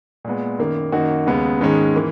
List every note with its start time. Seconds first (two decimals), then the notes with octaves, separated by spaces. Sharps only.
0.25 A#2 G#3 B3
0.59 F#2 D#3 A#3
0.92 F#2 D#3 A#3 D#4 F#4
1.27 D#2 C#3 G#3 B3
1.61 G#2 D#3 G#3 C#4
1.96 E3 A#3